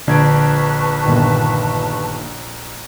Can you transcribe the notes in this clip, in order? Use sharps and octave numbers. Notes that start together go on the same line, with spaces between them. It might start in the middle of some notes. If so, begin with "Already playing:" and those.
A#1 D3 B4 A5 C#6 G#6 D7
G1 A#2 D#3